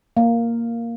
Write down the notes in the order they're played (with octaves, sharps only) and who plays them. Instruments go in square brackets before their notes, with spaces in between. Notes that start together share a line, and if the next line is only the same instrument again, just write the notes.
[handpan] A#3